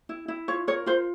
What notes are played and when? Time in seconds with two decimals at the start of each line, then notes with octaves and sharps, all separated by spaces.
0.09 E4
0.28 E4
0.48 F4 C#5
0.68 A#4 C#5
0.86 F4 C5